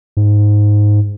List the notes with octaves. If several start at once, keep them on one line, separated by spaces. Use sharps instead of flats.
G#2